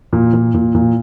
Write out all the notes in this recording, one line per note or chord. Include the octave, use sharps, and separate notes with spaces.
A#2
A#2
A#2
A#2